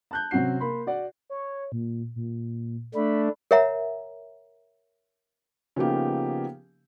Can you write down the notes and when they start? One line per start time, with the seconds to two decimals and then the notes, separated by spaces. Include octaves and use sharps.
0.11 A5 F#6 G6
0.31 C3 F#3 C4 C#4 F#4 C7
0.60 A#3 B5 C6
0.87 F#4 D5 F#5
1.30 C#5
1.72 A#2
2.16 A#2
2.95 A3 D4 B5
3.51 A#4 C#5 E5 F#5 A#5
5.76 C#3 F3 A#3 B3 D#4 G4